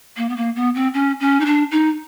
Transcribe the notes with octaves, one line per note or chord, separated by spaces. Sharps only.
A#3
B3
A#3
B3
C4
C#4
C#4
D#4
D4
D#4